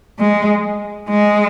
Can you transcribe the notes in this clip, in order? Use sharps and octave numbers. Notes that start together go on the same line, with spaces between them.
G#3
G#3